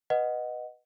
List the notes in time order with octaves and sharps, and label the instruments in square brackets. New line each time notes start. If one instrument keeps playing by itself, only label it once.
[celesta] B4 D#5 F#5